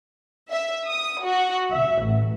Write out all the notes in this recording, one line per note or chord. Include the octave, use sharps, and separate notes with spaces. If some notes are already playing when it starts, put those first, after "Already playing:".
E5
D#6
F#4
E5
A1